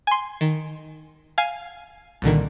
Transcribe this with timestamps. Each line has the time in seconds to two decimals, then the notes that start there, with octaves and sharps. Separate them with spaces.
0.07 G#5 C6
0.41 D#3
1.38 F5 G#5
2.22 C2 A#2 D3 D#3